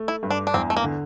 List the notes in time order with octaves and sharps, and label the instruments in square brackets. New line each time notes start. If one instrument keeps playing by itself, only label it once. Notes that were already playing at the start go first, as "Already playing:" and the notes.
Already playing: [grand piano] A3
[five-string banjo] E4
[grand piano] G2
[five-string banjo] D4
D4
[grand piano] E2 [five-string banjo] C4
[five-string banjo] A3
A#3
[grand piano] D3